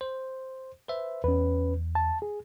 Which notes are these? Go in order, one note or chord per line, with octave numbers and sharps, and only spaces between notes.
C5
B4 C5 E5
E2 C#4 B4
A5
G#4